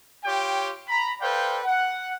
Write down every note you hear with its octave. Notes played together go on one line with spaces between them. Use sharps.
F4 G4 C#5 G5
A#5 B5
A4 B4 C5 D5 F5 G5
F#5